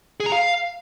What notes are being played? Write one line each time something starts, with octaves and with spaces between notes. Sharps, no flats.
G#4
A#5
F5